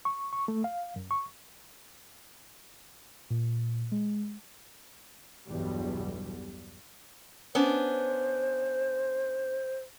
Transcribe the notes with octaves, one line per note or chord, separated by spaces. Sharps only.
C#6
C#6
A3
F5
F#2
C#6
A#2
G#3
B1 E2 G2 B2 G3
B3 C#4 D4 C5